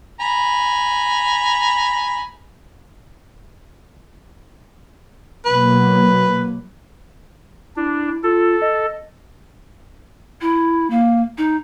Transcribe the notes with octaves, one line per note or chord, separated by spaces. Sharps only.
G#5 A#5 B5
B2 F#3 A#3 B4
D4 E4
F4 A4
D#5
E4
A#3
D#4